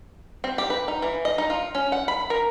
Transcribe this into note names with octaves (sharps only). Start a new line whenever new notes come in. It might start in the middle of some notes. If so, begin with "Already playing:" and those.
C4
G4
B4
D#4
E3
D#5
D#4
F4
C#4
F#5
B5
A#4